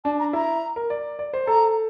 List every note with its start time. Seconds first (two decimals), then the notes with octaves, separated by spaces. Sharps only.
0.04 D4 A5
0.19 A#5
0.33 E4 A#5
0.76 A#4
0.90 D5
1.19 D5
1.33 C5
1.47 A4 A#5